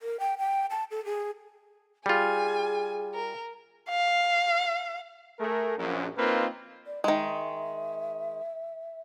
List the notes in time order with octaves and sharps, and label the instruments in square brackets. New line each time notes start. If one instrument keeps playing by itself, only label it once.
[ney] A#4
G5
G5
A5
A4
G#4
[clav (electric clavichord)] G3 F4 [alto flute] G#4 [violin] G#5
[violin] A#4
[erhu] F5
[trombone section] A3 G#4 A#4
A#1 F#2
A#3 C4 D#4 F4 A#4 B4
[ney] D5
[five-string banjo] D#3 G#3 [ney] E5